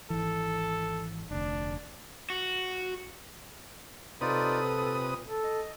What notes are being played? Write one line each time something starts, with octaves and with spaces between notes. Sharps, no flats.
G#1 E3 A4
F1 D2 D4
F#4
C3 D#4 F4 A4 B4 D5 D#6
A#2
A4
D#5